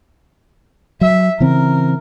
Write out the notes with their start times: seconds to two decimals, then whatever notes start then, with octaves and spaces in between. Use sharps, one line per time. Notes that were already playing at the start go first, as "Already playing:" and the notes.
1.01 F#3 E5
1.40 C#3 E3 C4 A#4